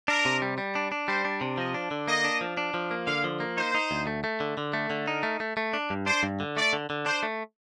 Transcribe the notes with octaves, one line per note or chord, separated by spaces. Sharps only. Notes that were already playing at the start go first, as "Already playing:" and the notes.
D4 A#4
C3
G3
G3
D4
D4
G3 C5
D4
C3
F3 D#5
D4
D3
A#3 D#5
D4
F3
D4
F3
A#3
D3 F5
F3
A#3
D#4 C5
D#4
D2
A3
A3
D3
D3
A3
D3
D#4 A#4
A3
A3
A3
D4
G2
D4 C5
G2
D3
A3 D5
D3
D3
D4 C5
A3